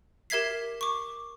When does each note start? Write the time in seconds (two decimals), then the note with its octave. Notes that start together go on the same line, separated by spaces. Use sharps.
0.30 G4 A#4 E5 G#6 B6 C7
0.81 C#6 D6